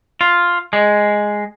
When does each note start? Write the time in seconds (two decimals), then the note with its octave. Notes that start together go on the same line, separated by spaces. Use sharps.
0.21 F4
0.73 G#3